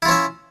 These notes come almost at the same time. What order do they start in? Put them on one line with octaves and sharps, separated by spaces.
E4 F4 C#4 E5